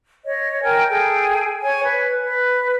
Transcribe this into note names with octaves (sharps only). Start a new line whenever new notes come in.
C#5 D#5
A#4 G5 G#5
G#4 A4 G5 G#5
C#5 G#5
B4
B4